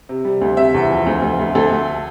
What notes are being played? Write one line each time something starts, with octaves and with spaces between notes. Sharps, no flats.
C3
G3
D2
C3 E5
E2
F3
D2
D2
D2
D2 A4
D2